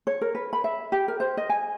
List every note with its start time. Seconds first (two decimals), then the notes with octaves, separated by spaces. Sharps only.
0.07 C#5
0.21 A#4
0.35 B4
0.53 B5
0.64 E5
0.92 G4
1.08 A#4
1.20 C5
1.37 D#5
1.49 G#5